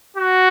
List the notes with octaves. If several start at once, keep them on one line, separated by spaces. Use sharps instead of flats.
F#4